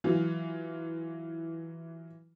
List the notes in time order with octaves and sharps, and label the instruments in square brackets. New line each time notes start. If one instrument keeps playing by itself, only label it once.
[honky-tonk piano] E3 F#3 F4